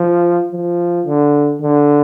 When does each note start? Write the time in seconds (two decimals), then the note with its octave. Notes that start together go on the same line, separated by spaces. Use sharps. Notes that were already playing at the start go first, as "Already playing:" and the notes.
Already playing: F3
0.52 F3
1.06 D3
1.62 D3